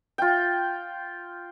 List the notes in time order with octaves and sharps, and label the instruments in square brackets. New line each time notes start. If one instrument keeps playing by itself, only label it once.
[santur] F4 G5